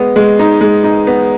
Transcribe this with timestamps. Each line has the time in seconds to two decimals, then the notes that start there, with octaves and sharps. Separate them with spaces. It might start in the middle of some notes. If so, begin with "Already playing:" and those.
Already playing: G#3 B3
0.16 G#3
0.39 D#4
0.61 G#3
0.84 D#4
1.07 B3